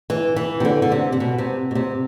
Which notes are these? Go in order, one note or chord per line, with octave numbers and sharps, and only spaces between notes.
E3
E3
C3
D3
D3
C3
C3
B2
C3
B2
C3